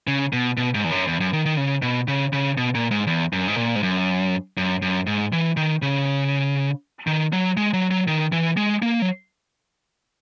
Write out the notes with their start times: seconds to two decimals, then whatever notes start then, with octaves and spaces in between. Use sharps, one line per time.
0.07 C#3
0.33 B2
0.57 B2
0.75 G#2
0.84 E2
0.91 F#2
1.08 E2
1.20 F#2
1.33 D#3
1.45 D#3
1.57 C#3
1.82 B2
2.08 C#3
2.33 C#3
2.58 B2
2.75 A#2
2.91 G#2
3.07 E2
3.33 F#2
3.48 G#2
3.57 A#2
3.76 G#2
3.83 F#2
4.57 F#2
4.82 F#2
5.07 G#2
5.33 E3
5.57 D#3
5.82 C#3
7.07 D#3
7.33 F#3
7.57 G#3
7.73 F#3
7.91 F#3
8.08 D#3
8.32 E3
8.57 G#3
8.82 A#3
9.02 F#3